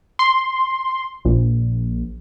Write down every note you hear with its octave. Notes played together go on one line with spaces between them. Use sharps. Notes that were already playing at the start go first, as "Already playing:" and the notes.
C6
A#1